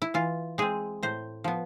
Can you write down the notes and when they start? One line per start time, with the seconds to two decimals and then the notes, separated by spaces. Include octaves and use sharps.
0.02 E4
0.14 E3 F4
0.58 G#3 C4 G#4
1.03 A2 C5
1.44 F3 B3